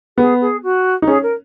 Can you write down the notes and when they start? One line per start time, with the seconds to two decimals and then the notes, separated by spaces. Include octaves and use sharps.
0.18 B3 G#4
0.41 G#4
0.63 F#4
1.02 D#4
1.07 C#4 G#4
1.22 A#4